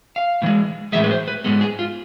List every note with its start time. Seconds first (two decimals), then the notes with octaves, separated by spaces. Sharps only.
0.16 F5
0.42 A2 E3 G#3
0.92 A2 E3 G#3 E5
1.04 B4
1.11 C5
1.28 B4
1.44 G#2 G#3 B3 A4
1.61 G#4
1.79 F4